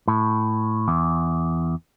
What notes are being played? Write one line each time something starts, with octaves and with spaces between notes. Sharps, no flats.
A2
E2